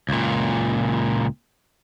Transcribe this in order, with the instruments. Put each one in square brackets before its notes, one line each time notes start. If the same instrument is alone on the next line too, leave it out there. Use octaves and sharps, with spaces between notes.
[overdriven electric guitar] C#2 A#2